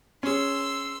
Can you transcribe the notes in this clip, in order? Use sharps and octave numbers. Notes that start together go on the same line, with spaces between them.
C#4 G#4 C6 E6